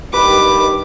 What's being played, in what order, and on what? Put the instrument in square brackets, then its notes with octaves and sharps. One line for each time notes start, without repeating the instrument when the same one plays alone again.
[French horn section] G2 D#3 G4 [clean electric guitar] B4 [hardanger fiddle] D6